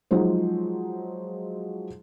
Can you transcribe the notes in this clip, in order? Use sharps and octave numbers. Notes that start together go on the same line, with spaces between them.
F3 F#3 G#3 D#4 C5